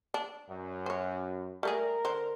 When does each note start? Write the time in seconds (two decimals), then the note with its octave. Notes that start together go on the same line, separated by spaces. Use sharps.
0.14 D4
0.49 F#2
0.86 C5 C#5
1.63 G3 A3 G#4 A#4
2.05 D3 C5